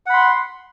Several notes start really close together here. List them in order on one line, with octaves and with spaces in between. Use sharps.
F#5 B5 C6